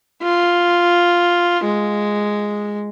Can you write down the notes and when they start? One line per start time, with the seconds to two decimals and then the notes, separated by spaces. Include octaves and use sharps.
0.22 F4
1.64 G#3